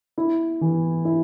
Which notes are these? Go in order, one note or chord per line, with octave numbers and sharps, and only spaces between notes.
E4
E3
E4